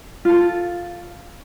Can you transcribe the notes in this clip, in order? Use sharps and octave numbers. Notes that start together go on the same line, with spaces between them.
F4 A4